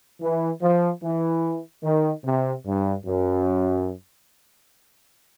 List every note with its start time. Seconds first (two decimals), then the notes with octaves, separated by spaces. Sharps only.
0.21 E3
0.62 F3
1.03 E3
1.84 D#3
2.24 C3
2.65 G2
3.06 F#2